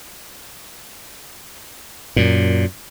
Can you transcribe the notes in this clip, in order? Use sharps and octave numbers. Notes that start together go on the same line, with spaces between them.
F#2 A#2